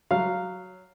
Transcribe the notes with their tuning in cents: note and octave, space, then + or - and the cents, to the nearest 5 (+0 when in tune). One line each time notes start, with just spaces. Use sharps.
F#3 +0 F5 +0